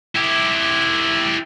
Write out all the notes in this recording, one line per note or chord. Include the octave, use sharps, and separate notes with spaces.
E4 G4